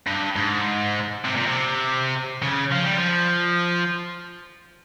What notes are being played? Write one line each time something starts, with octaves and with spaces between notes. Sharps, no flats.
G2
G#2
C3
A#2
C3
C#3
F3
G3
F3